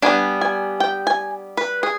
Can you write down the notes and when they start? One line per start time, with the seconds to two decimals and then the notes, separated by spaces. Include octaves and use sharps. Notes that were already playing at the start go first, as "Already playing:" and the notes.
0.02 G3 B3 D4 G#5
0.41 G#5
0.80 G5
1.07 G#5
1.57 B4
1.83 G#4